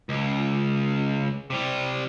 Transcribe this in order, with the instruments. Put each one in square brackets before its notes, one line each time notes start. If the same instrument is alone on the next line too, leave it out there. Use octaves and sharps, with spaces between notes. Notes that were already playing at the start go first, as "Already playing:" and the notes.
[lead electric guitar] C#2
C3 G3